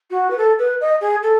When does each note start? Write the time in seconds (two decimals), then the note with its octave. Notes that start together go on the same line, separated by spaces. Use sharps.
0.10 F#4
0.30 B4
0.37 A4
0.58 B4
0.80 D#5
1.01 G#4
1.22 A4